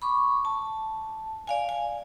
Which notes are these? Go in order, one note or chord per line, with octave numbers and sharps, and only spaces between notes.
B5 C#6 D6
A5
D5 F5 G#5
G#5